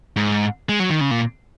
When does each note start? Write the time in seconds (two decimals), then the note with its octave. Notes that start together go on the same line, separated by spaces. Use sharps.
0.16 G#2
0.69 G#3
0.80 F#3
0.90 D#3
1.01 C#3
1.11 A#2